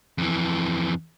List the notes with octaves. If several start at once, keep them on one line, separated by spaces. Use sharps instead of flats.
F2 E3